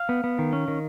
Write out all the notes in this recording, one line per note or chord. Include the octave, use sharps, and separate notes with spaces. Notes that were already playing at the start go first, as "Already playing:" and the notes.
Already playing: F5
B3
B3
D#3
C#4
D#3